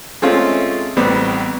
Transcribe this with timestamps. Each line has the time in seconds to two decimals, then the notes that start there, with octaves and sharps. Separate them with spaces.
0.22 G#3 A3 C4 C#4 F4
0.97 A1 G3 B3 C4